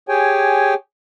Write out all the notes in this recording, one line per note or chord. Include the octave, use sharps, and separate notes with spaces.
G4 G#4 C#5 G5 G#5